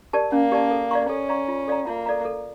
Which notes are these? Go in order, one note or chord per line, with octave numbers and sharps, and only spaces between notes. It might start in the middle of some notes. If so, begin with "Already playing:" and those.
G4 A#4 D5 A5
A#3 C#4
G4 A#4 D5 A5
A4
D5 F5 A#5 C#6
C#4 A4
D5 F5 A#5 C#6
F4
A4 D5 F5 A#5
A#3 F4
A4 D5 F5 A#5
A4